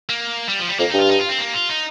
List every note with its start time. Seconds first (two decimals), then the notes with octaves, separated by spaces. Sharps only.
0.09 A#3
0.49 G3
0.59 F3
0.69 G3
0.79 F2 A#3
0.90 G2 D#4
0.99 F4
1.09 D#4
1.19 F4
1.29 C4
1.39 A#3
1.54 F4
1.69 D#4